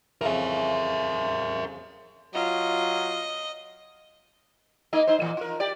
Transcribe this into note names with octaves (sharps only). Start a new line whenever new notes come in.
F2 C#3 E3 A#4 E5
F#3 F4 D#5
A#3 D#4 D#5
D#4 C5
A#2 E3
F4 A#4
G4 D5